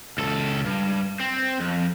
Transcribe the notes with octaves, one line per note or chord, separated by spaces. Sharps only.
C#2 A4
G2
C4
F2